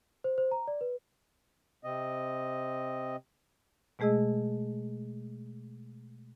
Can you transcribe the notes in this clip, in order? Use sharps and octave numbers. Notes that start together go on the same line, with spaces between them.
C5
C5
A#5
D5
B4
C3 C4 D#5
B2 G#3 A3 G#4 D#5 E6